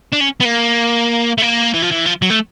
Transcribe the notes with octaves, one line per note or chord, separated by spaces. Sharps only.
D4
C#4
B3
A#3
A3
A#3
E3
F3
E3
F3
F#3
A3